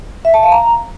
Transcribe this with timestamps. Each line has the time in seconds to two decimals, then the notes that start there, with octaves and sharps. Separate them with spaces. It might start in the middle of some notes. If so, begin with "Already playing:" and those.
0.25 E5
0.34 A5
0.43 F5
0.52 A#5